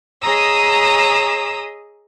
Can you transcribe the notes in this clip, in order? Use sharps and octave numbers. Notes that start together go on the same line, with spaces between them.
G#4 C#5 D#5 A#5 D#6 E6